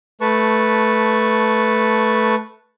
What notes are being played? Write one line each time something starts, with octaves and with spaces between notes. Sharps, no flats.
A3 B4 A5 C#6